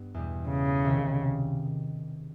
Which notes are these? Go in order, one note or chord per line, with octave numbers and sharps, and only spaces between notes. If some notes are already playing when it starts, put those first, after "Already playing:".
Already playing: G2 B3
E2 B2 G3
C#3
C#2 C3 D#3